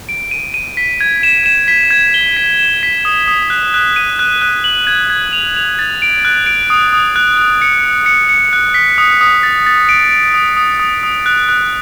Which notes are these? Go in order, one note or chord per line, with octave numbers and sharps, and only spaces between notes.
D7
D#7
D#7
B6
G#6
E7
E7
B6
G#6
G7
B6
E7
B6
D#6
D#6
F#6
F#6
D#7
F#6
F#6
F#7
G#6
G#6
F7
F7
A6
D7
F#6
D7
D#6
D#6
F#6
F#6
C#7
C#7
C#7
C#7
F#6
B6
D#6
D#6
A6
A6
D7
D7
D#6
D#6
D#6
D#6
F#6
F#6